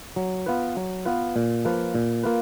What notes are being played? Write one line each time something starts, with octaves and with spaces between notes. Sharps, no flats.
F#3
B3 F4 B4
F#3
B3 F4 B4
A#2
F3 A#3 F4 B4
A#2
A#3 F4 B4